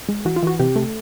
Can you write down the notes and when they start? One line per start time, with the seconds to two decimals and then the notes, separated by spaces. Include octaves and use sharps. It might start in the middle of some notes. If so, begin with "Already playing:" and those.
0.09 G#3
0.25 E3 F#4
0.36 F4
0.43 E3 F#4
0.60 C3 G4
0.76 A3